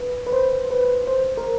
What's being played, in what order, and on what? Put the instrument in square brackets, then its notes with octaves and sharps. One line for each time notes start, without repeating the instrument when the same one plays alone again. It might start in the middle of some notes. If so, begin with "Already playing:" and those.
Already playing: [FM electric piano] B4
B4
C5
B4
C5
A#4